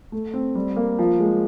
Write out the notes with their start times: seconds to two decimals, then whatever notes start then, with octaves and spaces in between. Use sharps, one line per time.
0.12 A3
0.34 C4
0.55 G3
0.76 A#3
0.99 F3
1.20 G#3